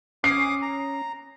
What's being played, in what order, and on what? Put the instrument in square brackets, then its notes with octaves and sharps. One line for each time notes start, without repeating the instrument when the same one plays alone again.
[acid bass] C#4 [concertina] D6 D#6 [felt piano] C7
[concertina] A#5